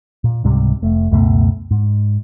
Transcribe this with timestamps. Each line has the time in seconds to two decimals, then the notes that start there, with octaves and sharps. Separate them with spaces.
0.24 A#2
0.44 C#2 G#2 C3 G3
0.82 F1 A3
1.11 C#2 F#2 B2 A3
1.71 G#2